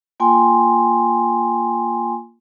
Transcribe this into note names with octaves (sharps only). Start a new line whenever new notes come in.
A#3 F4 G5 G#5 C6